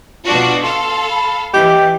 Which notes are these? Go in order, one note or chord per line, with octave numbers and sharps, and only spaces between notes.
B2 D4 F4 F#4
A4 F5 C6
B5
E3 G4 D#5